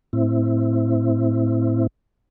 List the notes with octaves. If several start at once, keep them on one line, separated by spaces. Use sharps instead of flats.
A2 C4 E4